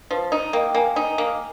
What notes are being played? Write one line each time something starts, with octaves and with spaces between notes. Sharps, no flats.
F3 B4
D#4
A#3 G5
G5
A#3 G#5
D#4
A#3